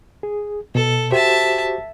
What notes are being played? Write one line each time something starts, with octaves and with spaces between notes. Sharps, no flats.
G#4
B2 A4
F#4 G4 C5 E5 A5